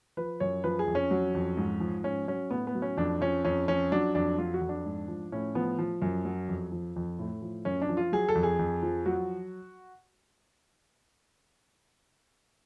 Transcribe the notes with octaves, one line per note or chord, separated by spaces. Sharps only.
F3 B4
F#2 C#5
F3 B4
G#4
F2
C#4
F#3
F2
G#2
F3
G#2 C#4
F#3 C#4
A2 B3
B3
F#3
C#4
F2 D4
F3 C#4
F2 C#4
F3 C#4
F#3 D4
F2 D4
F#3 F4
F#4
F2
D4
G#2
F3
A2 C#4
F3 B3
F3
F#2
F#3
F2
F3
F2
A2
F3
F#2 C#4
D4
F3
F4
F#3 G#4
A4
F2
G#4
F2
F3
F#3 F#4